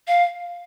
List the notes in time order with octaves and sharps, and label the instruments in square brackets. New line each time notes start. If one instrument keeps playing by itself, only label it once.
[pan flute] F5